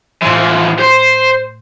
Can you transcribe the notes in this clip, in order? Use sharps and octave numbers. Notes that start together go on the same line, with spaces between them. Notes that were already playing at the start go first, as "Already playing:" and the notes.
A2 E3 F3 C6
C5